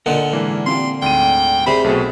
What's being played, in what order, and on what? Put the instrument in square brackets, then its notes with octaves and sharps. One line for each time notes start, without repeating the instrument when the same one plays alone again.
[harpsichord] A#2 D3 [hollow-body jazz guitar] A#4 D#5 [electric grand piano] F#5
[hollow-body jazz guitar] G#2 [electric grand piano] E3 A#3
[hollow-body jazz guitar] C4 F4 G4 [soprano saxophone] C6
[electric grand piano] D2 G#2 D#7 [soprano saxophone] G5
[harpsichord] C3 [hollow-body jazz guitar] G#4 C5 D5 [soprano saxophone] B5
[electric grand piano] B1 B2 [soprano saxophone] A3